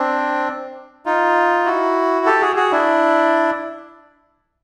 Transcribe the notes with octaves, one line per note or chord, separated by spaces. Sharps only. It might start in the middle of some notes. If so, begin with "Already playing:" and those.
Already playing: C4 D4
D#4 F4
E4 F#4
G4 A4
F#4 G#4
F#4 G#4
D4 E4